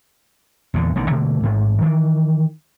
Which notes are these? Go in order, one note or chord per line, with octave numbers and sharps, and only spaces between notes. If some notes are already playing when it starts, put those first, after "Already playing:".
E2 A#2 D3
A1 B2 D3 D#3
B2 D3 A3 A#3
A1 G#2
D#3 E3